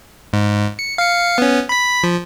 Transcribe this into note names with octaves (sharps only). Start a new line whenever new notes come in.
G#2
C#7
F5 C#7
B3 C#4
B5 B6
F3